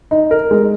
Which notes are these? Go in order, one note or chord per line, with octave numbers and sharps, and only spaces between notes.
D#4
A#4
G#3